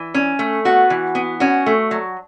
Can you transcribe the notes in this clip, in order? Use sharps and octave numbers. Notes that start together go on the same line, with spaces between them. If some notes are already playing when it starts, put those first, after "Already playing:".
Already playing: E3
C#4
A3
B3 F#4
E3
B3
C#4 F#4
A3
F#3